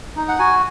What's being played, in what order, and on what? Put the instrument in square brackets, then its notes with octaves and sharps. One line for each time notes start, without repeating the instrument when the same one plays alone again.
[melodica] D#4
F#5
F#4 G#5